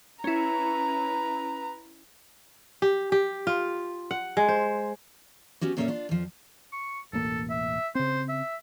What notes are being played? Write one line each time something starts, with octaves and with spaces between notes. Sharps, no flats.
C#4 E4 B4 A#5
G4
G4
F4
F#5
G#3
C5
B3 C#4 F#4 G4
A#2 A#3 C#4 G#4 A4 E5
D4 F4
F2 F3
C#6
E1 A1 A#3 A4
E5
C#3 C4 C5
E5